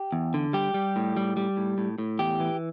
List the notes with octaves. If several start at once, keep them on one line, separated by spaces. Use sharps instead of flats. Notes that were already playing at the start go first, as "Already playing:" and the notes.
Already playing: G4
E2
D3
G3 G4
G3
A2
G3
G3
A2
A2
A2
E2 G4
E3